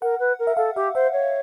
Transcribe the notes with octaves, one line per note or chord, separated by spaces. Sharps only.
A#4 F#5
B4
A#4
E5
A4 F5
G4 E5
C5 E5
C#5